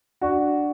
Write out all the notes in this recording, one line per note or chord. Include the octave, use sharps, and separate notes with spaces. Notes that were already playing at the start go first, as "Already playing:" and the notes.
D4 F#4